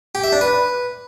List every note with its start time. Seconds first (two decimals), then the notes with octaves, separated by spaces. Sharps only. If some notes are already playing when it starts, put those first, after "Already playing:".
0.15 G4
0.24 E5
0.32 D4
0.41 B4